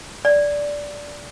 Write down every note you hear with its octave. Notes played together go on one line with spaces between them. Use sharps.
D5